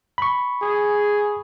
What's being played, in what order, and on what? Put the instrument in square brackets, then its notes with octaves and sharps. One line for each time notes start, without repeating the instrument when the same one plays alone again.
[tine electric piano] B5 C#6
[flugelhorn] G#4